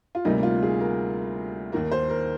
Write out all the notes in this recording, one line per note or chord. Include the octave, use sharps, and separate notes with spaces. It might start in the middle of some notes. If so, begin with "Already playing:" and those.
F4
D2 C3 G3 A#3 D#4
F4
G#4
A#4
D#2 D#3 A#3 A#4
C5
A#4